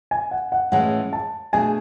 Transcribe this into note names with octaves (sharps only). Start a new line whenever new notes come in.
G#5
F#5
F#5
A2 E3 G#3 C#4 E4 F#5
A5
B2 A3 D4 G#4 G#5